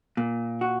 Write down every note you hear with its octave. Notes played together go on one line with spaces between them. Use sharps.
A#2
F#4